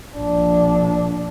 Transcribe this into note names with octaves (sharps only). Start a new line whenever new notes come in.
A#1 D4